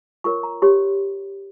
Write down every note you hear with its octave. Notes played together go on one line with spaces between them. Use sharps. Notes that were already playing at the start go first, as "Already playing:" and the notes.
F4 A#4 C#5 C#6
A#5
G4 C#5 C6